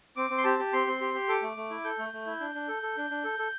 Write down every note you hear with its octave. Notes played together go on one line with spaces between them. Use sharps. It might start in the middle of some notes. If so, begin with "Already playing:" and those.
C4 D6
C4
C6
G4 A5
G4
C4 C6
C4
G4
G4
A4 D6
A3
A3
E4
A4 G6
A3
A3
E4
D4
D4
A4
A4
D4
D4
A4
A4